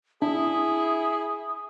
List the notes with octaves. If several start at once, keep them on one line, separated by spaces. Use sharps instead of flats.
D4 E4 G#4 D#6